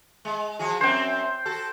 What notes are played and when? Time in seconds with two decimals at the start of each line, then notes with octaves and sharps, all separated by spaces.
0.25 G#3
0.59 F3 F#4 G#4
0.81 F#2 C4 C5 G5
1.45 F#4 A4